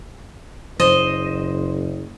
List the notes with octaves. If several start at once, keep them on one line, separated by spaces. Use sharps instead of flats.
F#1 C5 D#5